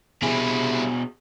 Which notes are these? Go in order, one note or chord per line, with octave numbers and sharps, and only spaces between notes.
B2 G3 E4 G#4